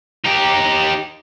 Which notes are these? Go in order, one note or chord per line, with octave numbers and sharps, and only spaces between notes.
D#4 G4